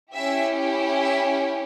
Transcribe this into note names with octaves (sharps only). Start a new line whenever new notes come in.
C#4 E4 G4 E5
E5